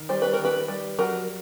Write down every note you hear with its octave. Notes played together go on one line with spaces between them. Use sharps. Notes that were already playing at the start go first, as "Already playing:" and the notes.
Already playing: D#3
G3 C5
B4
A#4
D#3
B4
G3
F#3 A#4